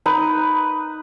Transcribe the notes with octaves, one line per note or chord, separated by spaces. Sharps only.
D#4 B4